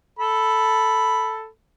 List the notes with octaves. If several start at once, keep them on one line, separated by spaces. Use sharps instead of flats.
A4 B5